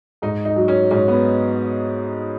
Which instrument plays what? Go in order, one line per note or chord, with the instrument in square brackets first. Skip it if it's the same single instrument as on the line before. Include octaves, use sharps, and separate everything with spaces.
[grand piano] G#2 D#4
D#4
F#3
C#4
G#2 C#4
B3